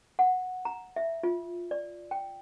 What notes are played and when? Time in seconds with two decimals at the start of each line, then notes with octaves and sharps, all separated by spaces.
0.19 F#5
0.65 A#5
0.96 E5
1.23 F4
1.71 D5
2.11 G5